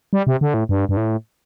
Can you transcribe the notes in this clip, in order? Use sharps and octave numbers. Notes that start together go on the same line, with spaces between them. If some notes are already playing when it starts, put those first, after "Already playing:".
G3
C3
D3
A2
G2
G2
A2